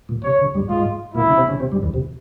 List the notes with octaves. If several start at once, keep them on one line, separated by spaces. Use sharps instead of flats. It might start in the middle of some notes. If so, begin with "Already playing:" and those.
A#2
C3 C#5
C#3
G2 G3
G#2 G#3 F4
A#2 A#3 E4
C#3 C#4
C3 C4
C#3 C#4
C3 C4
G2 G3
E2 E3
C3